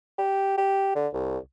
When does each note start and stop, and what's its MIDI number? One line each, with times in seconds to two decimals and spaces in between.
0.18 0.57 67
0.58 0.92 67
0.95 1.08 50
1.13 1.38 36